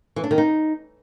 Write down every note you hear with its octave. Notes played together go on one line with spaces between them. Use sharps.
E3
D4
D#3
D#4